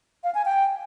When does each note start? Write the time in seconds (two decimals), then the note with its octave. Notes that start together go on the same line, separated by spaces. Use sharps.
0.24 F5
0.34 G#5
0.45 G5